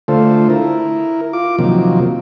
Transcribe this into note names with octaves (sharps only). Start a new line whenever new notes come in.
D3 A3 F4 A4 C5
E4 A#4
F4 D6
C3 D#3 F3 F#3 A#3